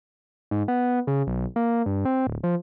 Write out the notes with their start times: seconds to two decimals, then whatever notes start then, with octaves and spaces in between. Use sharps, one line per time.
0.51 G#2
0.68 B3
1.07 C#3
1.27 B1
1.56 A#3
1.86 G2
2.05 C4
2.27 D1
2.44 F3